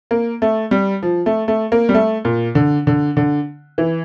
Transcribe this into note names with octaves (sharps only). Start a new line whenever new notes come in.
A#3
A3
G3
F3
A3
A3
A#3
G3
A3
A#2
D3
D3
D3
E3